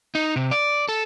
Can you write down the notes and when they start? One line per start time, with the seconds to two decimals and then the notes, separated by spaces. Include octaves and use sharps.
0.15 D#4
0.36 C3
0.51 D5
0.89 A4